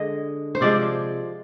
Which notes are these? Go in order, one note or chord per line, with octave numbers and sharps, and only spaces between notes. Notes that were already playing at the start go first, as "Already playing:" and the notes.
Already playing: D3 G#3 D#5
C5
C3 F3 G#3 D5